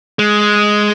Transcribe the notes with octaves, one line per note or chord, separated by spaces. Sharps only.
G#3